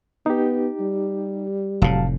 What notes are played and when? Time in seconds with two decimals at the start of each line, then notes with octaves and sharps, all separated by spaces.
0.26 B3 D#4 G4
0.80 G3
1.82 F1 A2 F#3 F5 A5